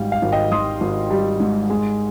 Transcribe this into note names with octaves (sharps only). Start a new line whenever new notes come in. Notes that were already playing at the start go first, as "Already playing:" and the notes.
Already playing: G#1 G#2 G3 D#5 F5 G5
F5
G#1
D#5 G5
G#1 C6 D#6
G#1
G3
G#2
G#3